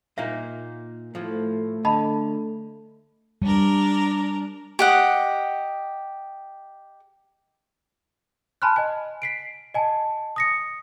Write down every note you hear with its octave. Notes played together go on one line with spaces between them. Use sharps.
A#2 A#3 D#4 E5
A2 F3 A3
D3 D#5 A5 B5
G3 D4 A#4
G4 D#5 F#5
G#5 A5 B5 C6 F6 F#6
D#5 G#5
B6 C7 D7
D#5 G#5 A5
D#6 A#6 C#7